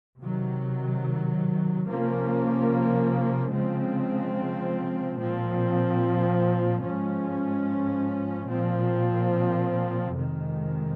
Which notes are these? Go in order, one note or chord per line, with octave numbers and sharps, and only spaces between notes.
C3 D#3 F#3
C3 F3 A#3 C#4
C#3 F3 G#3 C4
A#2 F3 C4
G#2 F3 G#3 C#4
A#2 F3 C4
F2 C3 D#3 G#3